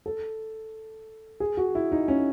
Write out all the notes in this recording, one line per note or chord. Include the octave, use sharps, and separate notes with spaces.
A4
G#4
F#4
E4
D#4
C#4